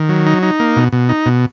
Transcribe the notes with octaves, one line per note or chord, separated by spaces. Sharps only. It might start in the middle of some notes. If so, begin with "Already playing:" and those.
Already playing: D#3
F#3
D#4
D#4
A#3
B2
B2
D#4
B2